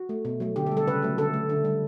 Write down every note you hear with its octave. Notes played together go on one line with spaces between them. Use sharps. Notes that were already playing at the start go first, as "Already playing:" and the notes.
Already playing: F#4
A3
B2
F#3 A3
D3 G4
A4
G3
A4
C#3 B4
F#3 A3
D3 A4
A3
D3
G3